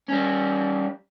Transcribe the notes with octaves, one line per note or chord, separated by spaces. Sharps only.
G3 C#4